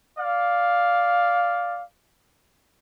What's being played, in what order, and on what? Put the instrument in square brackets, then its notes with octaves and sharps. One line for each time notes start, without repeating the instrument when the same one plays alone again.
[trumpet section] D5 F5